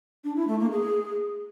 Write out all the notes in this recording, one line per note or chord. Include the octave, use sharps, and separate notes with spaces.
D4
E4
A3
A#3
G#4